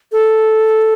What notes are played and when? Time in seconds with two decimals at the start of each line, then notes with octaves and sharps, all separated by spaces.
0.12 A4